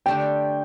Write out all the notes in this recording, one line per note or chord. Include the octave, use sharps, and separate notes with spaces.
D3 A3 D4 G4 G5